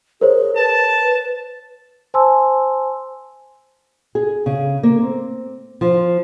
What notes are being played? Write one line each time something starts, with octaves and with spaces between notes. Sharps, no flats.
G#4 A#4 C5 C#5
B4 A5
C5 G#5 A5 C6 E6
G#4
C#3
A#3
C4
F3